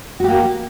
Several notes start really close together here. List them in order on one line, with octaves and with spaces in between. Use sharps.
F#4 G4 A#3